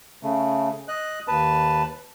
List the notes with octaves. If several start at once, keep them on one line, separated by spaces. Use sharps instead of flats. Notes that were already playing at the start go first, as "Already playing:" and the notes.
C#3 A3
D#5 F#6
D#2 B4 A5